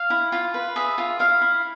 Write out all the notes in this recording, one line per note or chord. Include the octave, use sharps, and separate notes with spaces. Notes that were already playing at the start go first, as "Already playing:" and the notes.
Already playing: F5
E4
F4
B4
G#4 E5
F4
E4 F5
E4